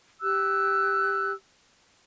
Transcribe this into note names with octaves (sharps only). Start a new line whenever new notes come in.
G4 E6 F#6